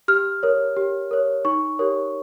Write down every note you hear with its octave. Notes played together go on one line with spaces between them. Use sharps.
G4 F6
A#4 C#5
G4
A#4 C#5
D#4 C#6
G4 A#4 C#5